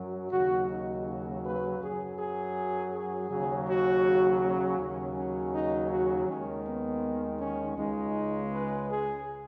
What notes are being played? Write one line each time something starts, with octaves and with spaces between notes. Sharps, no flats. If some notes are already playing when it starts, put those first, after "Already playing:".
Already playing: F#2 F#3
D#2 C#3 F#3 F#4
D#4
F#4
B4
F#2 F#3 G#4
G#4
G#4
D#2 C#3 F#3
F#4
C#4
D#2 C#3 F#3
C#4
D#4
F#4
D#2 D#3 G#3 C#4
B3
C#4
C#2 C#3 G#3 D#4
B4
G#4